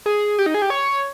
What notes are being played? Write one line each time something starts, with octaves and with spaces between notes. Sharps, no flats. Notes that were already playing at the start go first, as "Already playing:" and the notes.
G#4
G4
D#4
G#4
G4
C#5